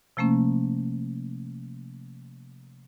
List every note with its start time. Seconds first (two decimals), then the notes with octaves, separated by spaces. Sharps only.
0.17 C3 F3 A3 A#3 C#4